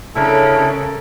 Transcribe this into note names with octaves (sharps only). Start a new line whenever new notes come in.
C#3 C#4 D4 E4 A4 A#4